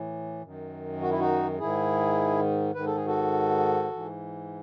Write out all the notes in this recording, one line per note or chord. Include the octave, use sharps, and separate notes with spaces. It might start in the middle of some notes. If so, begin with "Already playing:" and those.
Already playing: A2 E3
F#2 D#3
F#4
E4
D#4 F#4
G#2 D#3 E4 G#4
G#2 D#3 B4
A4
G#4
F#4 A4
G#2 E3